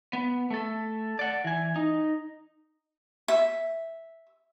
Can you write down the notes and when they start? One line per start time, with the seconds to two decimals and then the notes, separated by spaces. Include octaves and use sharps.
0.13 B3
0.51 A3 A4
1.19 D5 F#5
1.44 E3 G#5
1.76 D#4
3.28 E5